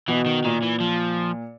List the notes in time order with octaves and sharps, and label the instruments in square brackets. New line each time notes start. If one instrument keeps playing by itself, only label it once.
[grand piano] B2 [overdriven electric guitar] E3
[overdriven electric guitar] D#3
[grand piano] A#2 [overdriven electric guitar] D#3
[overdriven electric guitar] E3
F3